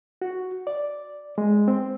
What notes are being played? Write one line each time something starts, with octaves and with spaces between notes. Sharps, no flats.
F#4
D5
G#3
C4